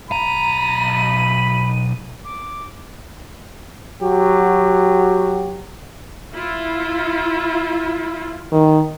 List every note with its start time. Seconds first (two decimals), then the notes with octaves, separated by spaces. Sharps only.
0.11 B1 A#5 B5 D#7
2.24 D6
4.01 F#3 F#4 G4
6.32 E4 F4
8.52 D#3